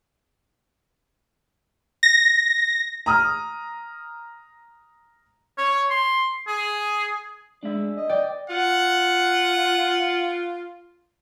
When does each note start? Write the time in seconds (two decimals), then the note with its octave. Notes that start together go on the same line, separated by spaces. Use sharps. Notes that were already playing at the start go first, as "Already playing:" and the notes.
2.03 A#6
3.06 A#5 D#6 F6
5.58 C#5
5.91 C6
6.47 G#4
7.63 G#3 D4 E5
7.97 D#5
8.09 D5 G5
8.50 F4 F#5